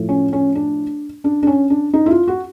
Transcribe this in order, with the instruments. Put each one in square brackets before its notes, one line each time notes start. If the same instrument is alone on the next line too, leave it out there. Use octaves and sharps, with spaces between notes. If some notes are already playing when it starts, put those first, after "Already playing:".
Already playing: [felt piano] A2 F3 A3
C#4
C#4
D4
D4
D4
C#4
D4
D#4
E4
F4
F#4